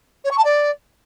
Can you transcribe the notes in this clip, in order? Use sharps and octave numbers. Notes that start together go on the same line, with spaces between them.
C#5
C#6
A5
D5